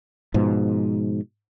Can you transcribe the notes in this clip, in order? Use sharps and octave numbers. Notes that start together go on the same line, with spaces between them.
G#2 B2 F3